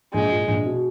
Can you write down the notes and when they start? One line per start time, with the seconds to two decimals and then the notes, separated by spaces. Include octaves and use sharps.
0.14 A#1 G#3
0.31 A#2
0.48 A#1
0.65 B2